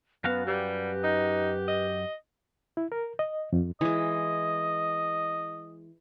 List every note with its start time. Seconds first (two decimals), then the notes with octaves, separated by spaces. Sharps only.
0.24 F#2 B3 F#4 F5
0.47 G3 G4 B4
1.04 D#4
1.68 D#5
2.77 E4
2.92 A#4
3.19 D#5
3.53 F2
3.81 E3 G#3 D#5